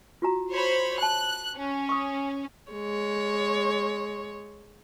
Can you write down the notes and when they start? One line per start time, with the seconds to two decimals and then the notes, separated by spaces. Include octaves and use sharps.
0.22 F4 F#4 A#5
0.51 C5 C#5 B5
0.98 A5 B5 F#6
1.55 C#4
1.89 C#6 D#6
2.72 G#3 C#5